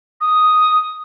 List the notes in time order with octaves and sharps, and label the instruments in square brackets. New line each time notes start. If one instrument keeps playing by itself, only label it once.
[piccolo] D#6